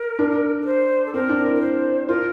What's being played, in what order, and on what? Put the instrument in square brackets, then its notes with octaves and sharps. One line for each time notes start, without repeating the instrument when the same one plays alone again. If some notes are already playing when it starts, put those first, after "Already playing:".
Already playing: [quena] A#4
[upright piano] D4
[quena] A#4
C5
A4
[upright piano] C4 [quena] A#4
[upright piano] D4
E4
[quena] A#4
C5
[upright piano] F4 [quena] A#4